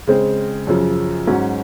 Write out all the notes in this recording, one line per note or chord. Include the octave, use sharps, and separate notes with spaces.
C#3 G#3 C4
F#2 C#3 F3
G#2 F#3 C#4 F#4